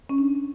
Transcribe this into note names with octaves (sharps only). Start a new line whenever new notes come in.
C#4
D4